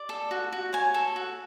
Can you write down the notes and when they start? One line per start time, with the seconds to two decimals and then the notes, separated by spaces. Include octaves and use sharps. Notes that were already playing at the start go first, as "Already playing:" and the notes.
Already playing: D5
0.09 A4
0.31 F#4
0.52 F#4
0.73 C#5 G#5
0.94 A4
1.16 F#4